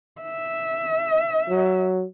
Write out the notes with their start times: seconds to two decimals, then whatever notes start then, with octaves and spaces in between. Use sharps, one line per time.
0.22 E5
1.49 F#3